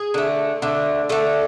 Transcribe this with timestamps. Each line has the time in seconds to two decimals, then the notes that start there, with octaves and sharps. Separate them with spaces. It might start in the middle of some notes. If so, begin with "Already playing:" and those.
Already playing: G#4
0.14 D3 A3
0.62 D3 A3
1.09 D3 A3 A4